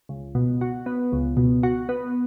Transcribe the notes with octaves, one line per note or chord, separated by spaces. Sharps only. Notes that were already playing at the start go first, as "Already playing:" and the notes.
C#2
B2
F#4
B3
C#2
B2
F#4
B3